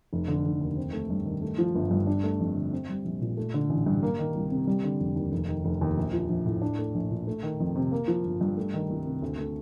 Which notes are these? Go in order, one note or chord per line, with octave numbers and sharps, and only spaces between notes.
F1
D3
F1
D#2
C4
A3
G2
D#3
A3
F3
G1
G2
D4
A3
F2
D3
C4
G3
A#1
A#2
A3
D3
A1
G2
A#3
D#3
C2
C3
G3
D3
F1
D#2
F1
D#3
F1
D#2
A#1
F3
A#1
A2
D4
A3
A#1
A#2
A3
D#3
F2
C3
A#3
F3
G1
G2
A3
D#3
C2
C3
D2
A3